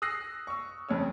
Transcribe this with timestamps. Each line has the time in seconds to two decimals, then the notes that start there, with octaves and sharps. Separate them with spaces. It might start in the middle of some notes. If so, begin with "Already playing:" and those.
0.02 D#6 E6 F#6 A#6 C7
0.47 C#6 E6
0.89 D#1 F2 C#3 C#5 E6